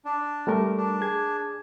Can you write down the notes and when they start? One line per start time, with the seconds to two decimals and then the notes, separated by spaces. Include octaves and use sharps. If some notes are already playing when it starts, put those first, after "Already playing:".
0.05 D4
0.47 G3 A3 A#4
0.77 D4
1.01 G#4 G#6